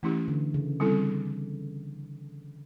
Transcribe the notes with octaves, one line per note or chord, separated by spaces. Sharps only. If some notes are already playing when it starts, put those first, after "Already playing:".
E3 A3 C#4 E4 G4
D3
C#3
G3 C4 E4 A4